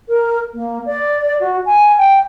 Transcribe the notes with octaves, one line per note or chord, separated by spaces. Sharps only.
A#4
A#3
D5
F#4
G#5
G5